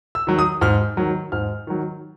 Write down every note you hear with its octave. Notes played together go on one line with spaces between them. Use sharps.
E6
D#3 F#3
D#6
G#2 F6
D#3 F#3
G#2 F6
D#3 F#3